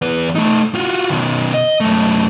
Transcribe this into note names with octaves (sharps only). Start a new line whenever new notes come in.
E2 B4
A3 D#4
F4 F#4
B2 D#3
D#5
F#2 A3